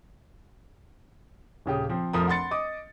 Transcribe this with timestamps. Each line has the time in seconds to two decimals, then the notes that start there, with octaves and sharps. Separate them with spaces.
1.66 D#1 C#3 G4 D#6
1.89 F3 C4
2.13 F1 F3 A#4 D#6
2.27 F#5 B5 C6 A6 C#7
2.51 D#5 D6 D#6